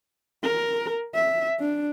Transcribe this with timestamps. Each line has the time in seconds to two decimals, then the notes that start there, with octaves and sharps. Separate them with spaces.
0.44 A#4
1.15 E5
1.60 D4